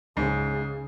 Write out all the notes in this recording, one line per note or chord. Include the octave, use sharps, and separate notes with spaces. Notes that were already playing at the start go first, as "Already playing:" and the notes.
C#2 G#2 C#3